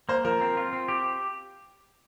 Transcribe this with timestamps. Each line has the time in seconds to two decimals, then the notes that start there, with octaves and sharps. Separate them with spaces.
0.09 A#3 C5
0.25 F3 A#4
0.41 C4
0.57 F4
0.73 C4
0.88 G4